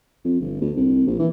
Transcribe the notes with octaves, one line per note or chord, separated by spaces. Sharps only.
F2
G1
D2
C2
A#1
E3